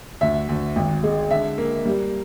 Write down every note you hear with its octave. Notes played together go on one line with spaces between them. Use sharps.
D2 E5
D2
G#1
G#3
D3 E5
A#3
G3